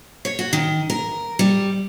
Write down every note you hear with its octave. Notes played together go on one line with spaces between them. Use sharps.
C#5
F#4
D#3
A#4
G3